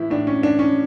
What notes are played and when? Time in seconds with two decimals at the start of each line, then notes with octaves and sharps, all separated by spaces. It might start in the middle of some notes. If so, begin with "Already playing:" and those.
Already playing: A2 E3 E4
0.10 A2 D4
0.27 C#4
0.42 E3 D4
0.59 C#4